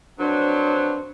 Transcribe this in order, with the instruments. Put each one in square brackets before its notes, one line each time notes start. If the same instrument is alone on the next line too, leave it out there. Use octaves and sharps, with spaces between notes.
[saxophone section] F2 F#3 [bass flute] D4 [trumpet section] B4 C5